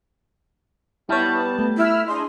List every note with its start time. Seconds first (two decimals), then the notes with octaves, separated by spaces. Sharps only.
1.09 G3 B3 E4 C#5 A5
1.59 A3
1.77 E4 B5 E6 F6
2.07 D4 G#4 D#5 C6